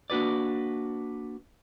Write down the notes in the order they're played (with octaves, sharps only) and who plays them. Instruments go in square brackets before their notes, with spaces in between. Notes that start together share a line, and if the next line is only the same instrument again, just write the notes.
[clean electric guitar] A#3 D4 F#4 B4 D5